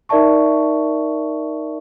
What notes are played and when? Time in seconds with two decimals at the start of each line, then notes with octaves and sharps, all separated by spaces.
0.09 D#4 A#4 D5 E5 A5 C#6